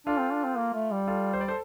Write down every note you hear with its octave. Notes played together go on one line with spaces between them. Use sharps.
D4 F4 A4
C4
D4
C4
A#3
A3
G3
F4 A4
C5
D5
A4 C5